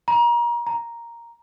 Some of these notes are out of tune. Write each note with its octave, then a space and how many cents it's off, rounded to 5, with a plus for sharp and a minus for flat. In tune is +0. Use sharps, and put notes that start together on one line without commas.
A#5 +30
A#5 +5